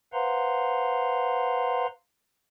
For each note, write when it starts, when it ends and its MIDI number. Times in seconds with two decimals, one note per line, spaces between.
0.13 1.87 71
0.13 1.87 72
0.13 1.87 77
0.13 1.87 78
0.13 1.87 82
0.13 1.87 84